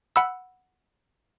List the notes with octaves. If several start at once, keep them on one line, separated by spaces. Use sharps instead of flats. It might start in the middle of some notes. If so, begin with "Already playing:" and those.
F#5 B5 E6